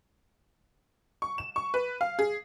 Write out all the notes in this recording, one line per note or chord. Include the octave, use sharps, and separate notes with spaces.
C#6
E7
C#6
B4
F5
G#4